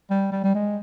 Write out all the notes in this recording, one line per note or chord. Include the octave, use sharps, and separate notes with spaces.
G3
G3
G3
G#3